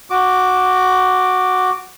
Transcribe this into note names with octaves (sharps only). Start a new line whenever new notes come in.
F#4 D6